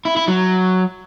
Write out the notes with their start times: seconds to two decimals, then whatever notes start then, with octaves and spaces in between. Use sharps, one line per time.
0.05 E4
0.16 E4
0.28 F#3